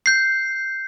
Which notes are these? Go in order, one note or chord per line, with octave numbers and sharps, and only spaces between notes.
G6 C7